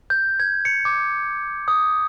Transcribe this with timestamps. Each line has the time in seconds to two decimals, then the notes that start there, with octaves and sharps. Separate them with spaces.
0.10 G6
0.40 G#6
0.65 C#7
0.85 D6
1.68 D#6